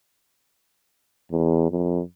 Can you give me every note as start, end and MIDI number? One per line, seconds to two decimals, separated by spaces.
1.32 1.70 40
1.71 2.01 41